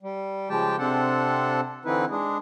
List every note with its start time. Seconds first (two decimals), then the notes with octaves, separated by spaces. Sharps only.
0.03 G3
0.49 C#3 F3 G#3 G4 G5 A5
0.79 C3 C4 D4 A4 F#5 A5
1.85 D3 E3 C4 D#4 E4 B4
2.10 G#3 D4 G#4